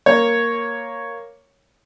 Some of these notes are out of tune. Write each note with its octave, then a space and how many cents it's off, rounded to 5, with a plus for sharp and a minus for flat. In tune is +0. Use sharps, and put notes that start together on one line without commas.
A#3 +0 C#5 +0